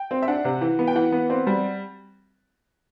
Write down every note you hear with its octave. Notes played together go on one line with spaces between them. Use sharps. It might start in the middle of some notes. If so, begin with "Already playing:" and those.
Already playing: G5
C4
E5
D4 F#5
C3
E3
B3
G5
E3 F#5
B3
C4
G3